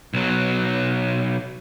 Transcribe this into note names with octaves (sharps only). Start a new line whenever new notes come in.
B1 F#3